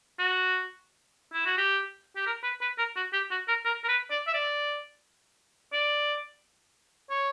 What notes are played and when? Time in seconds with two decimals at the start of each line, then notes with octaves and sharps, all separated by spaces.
0.19 F#4
1.33 E4
1.46 F#4
1.58 G4
2.16 G4
2.27 A#4
2.43 B4
2.61 B4
2.78 A#4
2.96 F#4
3.13 G4
3.31 F#4
3.48 A#4
3.65 A#4
3.84 A#4
3.88 B4
4.10 D5
4.27 E5
4.34 D5
5.73 D5
7.10 C#5